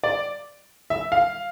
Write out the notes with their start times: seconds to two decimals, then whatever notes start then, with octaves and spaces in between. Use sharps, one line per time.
0.03 D5
0.90 E5
1.12 F5